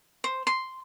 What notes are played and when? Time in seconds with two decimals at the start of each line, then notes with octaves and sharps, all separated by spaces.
0.24 C5
0.47 C6